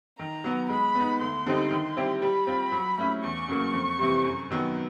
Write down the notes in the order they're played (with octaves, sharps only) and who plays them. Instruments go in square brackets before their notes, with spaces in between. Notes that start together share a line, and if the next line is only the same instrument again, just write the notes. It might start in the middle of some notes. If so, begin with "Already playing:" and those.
[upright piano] D#3 [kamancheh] A#5
[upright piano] F#3 B3
[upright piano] G#3 [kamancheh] B5
[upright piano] B3 D#4
[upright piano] D2 [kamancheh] C6
[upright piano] D3 G3 C4 D#4
D#3
G3 C4 E4 G4
[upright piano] G3 [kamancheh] B5
[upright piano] C4 F4
F#3
A3 C#4 E4
[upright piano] E2 [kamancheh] C#6
[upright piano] C#3 F#3 A#3
F2
C3 E3 G3
F#2
D#3 F#3 B3